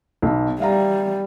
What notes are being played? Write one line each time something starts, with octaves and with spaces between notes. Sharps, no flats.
B1 B2
G3 E5 F5 A#5